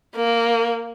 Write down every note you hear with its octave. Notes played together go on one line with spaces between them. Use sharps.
A#3